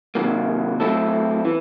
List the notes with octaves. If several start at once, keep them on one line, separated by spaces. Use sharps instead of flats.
C3 D#3 F#3 A#3
F#3 A3 C4 E4 A4
E3